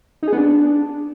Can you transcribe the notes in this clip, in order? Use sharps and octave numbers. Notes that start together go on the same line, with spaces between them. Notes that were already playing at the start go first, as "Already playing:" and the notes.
D#4
G#4
B3
D4